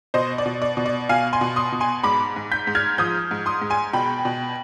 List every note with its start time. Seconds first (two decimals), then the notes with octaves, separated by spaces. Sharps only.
0.14 B2 C5 D#5
0.38 D5
0.46 B2
0.62 D5
0.77 B2
0.86 D5
1.09 B2 F5 G#5
1.33 G#5 C6
1.41 B2
1.56 C6 D#6
1.72 B2
1.80 G#5 C6
2.03 G#2 B5 D6
2.36 G#2
2.51 G6 B6
2.67 G#2
2.75 F6 G#6
2.98 F3 D#6 G6
3.31 G#2
3.46 C6 D#6
3.61 G#2
3.70 G#5 C6
3.93 B2 G5 B5
4.25 B2